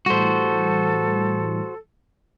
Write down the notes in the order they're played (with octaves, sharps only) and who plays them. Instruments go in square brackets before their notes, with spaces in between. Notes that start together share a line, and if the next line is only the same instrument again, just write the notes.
[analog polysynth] A2 E3 G3 [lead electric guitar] F#4 C5 [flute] A4